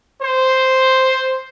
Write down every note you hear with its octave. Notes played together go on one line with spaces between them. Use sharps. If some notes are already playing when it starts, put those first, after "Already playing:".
C5